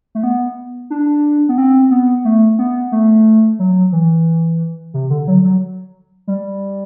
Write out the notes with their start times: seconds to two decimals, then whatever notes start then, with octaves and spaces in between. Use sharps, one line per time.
0.15 A3
0.23 B3
0.90 D4
1.49 B3
1.58 C4
1.91 B3
2.25 A3
2.59 B3
2.92 A3
3.59 F#3
3.92 E3
4.94 C3
5.10 D3
5.28 F#3
5.44 F#3
6.27 G3